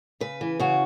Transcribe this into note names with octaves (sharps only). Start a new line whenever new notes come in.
C#3 B4
E3
C#3 F#4